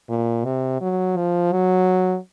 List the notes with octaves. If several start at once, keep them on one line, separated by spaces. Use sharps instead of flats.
A#2
C3
F#3
F3
F#3